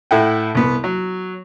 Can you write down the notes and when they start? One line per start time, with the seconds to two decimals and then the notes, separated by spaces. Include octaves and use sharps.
0.11 A2 E4 A4 F#5 G5
0.55 C2 B3
0.84 F#3